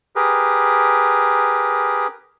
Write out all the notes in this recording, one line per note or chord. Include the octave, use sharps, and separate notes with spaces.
G4 G#4 A#4 B4